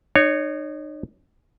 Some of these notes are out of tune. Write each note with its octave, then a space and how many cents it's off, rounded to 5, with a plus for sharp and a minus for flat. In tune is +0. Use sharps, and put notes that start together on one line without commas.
D#4 -35 C#5 +0